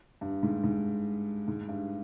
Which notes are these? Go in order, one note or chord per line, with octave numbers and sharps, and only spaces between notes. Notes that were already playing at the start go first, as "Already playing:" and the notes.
G2
G#2
G#2
G#2
G2